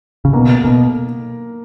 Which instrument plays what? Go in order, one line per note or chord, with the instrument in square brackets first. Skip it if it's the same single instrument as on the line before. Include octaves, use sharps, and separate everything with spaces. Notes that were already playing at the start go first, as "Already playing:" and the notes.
[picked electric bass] C#3
[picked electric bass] B2 [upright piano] A#3
[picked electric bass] B2 [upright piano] A#4